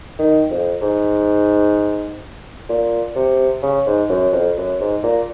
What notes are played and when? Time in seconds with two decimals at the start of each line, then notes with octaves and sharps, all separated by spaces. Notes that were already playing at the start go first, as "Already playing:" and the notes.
0.19 D#3
0.51 F2
0.82 G#2
2.69 A#2
3.16 C3
3.63 C#3
3.87 G#2
4.10 F#2
4.33 F2
4.57 F#2
4.80 G#2
5.04 A#2